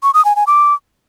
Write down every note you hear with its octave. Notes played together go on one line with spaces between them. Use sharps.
C#6
D#6
G#5
G#5
D6